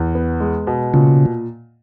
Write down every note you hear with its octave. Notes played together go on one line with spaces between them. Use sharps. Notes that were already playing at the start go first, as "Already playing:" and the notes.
Already playing: E2
B3
G#3
B2
A#2 C#3